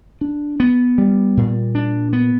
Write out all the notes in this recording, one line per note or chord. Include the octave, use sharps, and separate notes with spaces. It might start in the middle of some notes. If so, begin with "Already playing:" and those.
D4
B3
G3
A#2
D4
B3